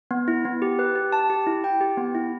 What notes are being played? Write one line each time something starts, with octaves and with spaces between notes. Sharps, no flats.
B3
E4
B3
G4
B4
G4
A5
G4
E4
G5
G4
B3
E4